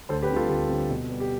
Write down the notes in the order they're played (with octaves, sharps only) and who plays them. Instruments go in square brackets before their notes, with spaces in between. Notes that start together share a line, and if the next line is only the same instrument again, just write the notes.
[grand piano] D2 A4 C5
G4 B4
D3 G3 C4
F4 A4
D2 G4
D3 G3 C4
B2
G3 B3
G4